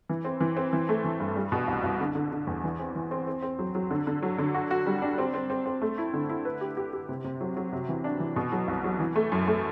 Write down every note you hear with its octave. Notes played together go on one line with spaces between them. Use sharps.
E3
C4
E3
C4
E3
A3
E3
G2
G3
B2
C2
C2
D3
D3
D3
E2
E3
C4
E3
C4
C4
C4
F#3
F#3
D3
D3
F#3
D3
F#4
F#4
G3
D4
C4
C4
C4
C4
A3
E4
D3
E4
B4
G4
G4
G4
C3
C3
F#3
F#3
C3
E3
D4
E3
B2
F#3
C2
F#3
E3
A3
F#2
A3